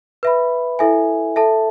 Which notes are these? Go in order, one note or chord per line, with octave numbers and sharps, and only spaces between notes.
B4 E5 B5
E4 A4 E5 G#5
A4 E5 A5